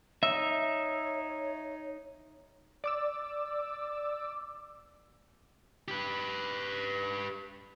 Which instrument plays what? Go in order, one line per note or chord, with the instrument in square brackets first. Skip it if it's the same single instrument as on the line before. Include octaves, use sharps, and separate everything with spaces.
[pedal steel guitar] D#4 E6 [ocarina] C#5 [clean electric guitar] E5
[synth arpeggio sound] D5 D6 E6
[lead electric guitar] G4 B4